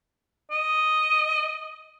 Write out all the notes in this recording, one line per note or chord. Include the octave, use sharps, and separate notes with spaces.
D#5